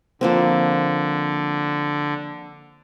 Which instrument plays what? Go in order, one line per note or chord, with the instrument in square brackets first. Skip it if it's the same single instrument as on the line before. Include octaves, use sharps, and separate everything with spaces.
[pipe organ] D3 [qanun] F3 A#3 C4